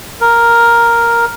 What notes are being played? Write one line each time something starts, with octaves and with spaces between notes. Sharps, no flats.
A#4